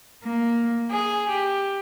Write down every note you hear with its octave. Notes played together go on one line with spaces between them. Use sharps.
A#3
G#4
G4